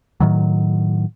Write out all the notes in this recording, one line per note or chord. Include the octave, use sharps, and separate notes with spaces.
A2 D#3 F#3